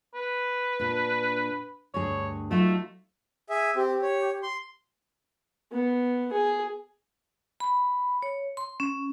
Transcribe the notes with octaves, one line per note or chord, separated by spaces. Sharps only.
B4
A#2 D4
D2 G2 G#4 C#5
F#3 A3 D#4 F4
G#4 E5
C4 G4
C#5
C6
B3
G#4
B5
C#5
C6
C#4